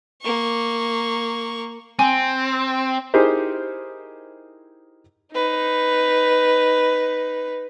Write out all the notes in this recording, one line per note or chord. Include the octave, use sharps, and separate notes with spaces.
A#3 C#6
C4 G#5
D#4 E4 G4 G#4 A#4 C5
D#4 B4